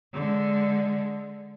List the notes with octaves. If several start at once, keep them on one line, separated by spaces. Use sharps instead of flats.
D3 G#3